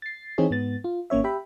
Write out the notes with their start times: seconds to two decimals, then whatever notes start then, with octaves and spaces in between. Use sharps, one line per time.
0.02 A6 C7
0.38 E3 C4 D#4 G#4 C#5
0.50 G#2 B3 A6
0.84 F4
1.10 G#1 A#3 C#4 C#5 E5
1.24 G4 E5 G5 B5